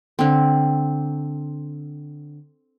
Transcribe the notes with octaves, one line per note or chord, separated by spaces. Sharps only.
D3 C4